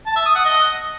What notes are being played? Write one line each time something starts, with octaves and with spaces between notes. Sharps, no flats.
A5
E5
D#6
F#5
D#5